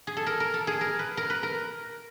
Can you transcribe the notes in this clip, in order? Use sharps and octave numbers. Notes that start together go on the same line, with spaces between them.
G#4
A4
A#4
A#4
A4
G#4
A#4
B4
A#4
B4
A#4